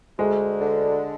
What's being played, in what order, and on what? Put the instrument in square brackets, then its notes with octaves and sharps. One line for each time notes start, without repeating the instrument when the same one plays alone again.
[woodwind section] D2 [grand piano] G#3
[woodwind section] D3